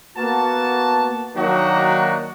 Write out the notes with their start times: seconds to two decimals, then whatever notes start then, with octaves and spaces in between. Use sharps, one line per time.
0.17 A#3 B3 F#4 A5
1.36 D#3 F#3 A#3 D4 D#4 F#4